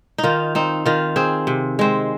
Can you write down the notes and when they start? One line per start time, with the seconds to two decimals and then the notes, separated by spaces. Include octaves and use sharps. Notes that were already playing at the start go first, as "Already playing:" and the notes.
0.18 D#4
0.23 D#3 F4
0.55 C4 D#4
0.86 D#3 F4
1.16 C4 G#4
1.47 C3
1.79 G#3 C4